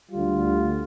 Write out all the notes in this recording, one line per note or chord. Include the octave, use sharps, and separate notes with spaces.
D2 D3 G3 F4